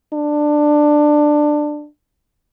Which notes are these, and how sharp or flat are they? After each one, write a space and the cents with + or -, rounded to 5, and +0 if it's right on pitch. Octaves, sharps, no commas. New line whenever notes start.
D4 +15